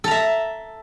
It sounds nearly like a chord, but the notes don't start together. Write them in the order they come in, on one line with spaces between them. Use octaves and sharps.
A4 A#5 E5